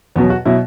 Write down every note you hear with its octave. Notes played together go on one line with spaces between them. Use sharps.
E2 B2 F#3 B3
F#4
B2 F#3 E4